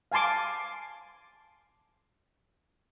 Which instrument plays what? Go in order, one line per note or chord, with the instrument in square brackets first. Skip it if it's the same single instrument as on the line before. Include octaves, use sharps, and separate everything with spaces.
[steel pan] F5 G#5 A5 C6 D6